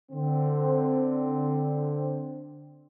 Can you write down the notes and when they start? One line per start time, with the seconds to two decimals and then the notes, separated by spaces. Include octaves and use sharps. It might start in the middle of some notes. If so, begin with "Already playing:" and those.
0.12 D3 C4